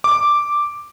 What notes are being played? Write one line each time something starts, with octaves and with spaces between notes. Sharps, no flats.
D6